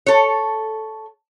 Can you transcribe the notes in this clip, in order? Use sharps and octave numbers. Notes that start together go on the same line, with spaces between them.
A4 C#5